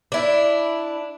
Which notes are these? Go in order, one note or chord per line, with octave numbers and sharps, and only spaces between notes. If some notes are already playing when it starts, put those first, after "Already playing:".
D4 E4